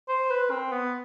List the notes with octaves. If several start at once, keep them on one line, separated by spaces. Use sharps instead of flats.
C5
B4
C4
B3